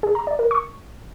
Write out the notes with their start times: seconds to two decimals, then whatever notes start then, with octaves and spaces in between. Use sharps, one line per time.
0.03 G#4
0.15 A#5
0.27 D5
0.39 A#4
0.51 C#6